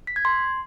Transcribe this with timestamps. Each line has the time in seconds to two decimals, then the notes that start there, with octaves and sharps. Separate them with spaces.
0.07 B6
0.16 G#6
0.25 C6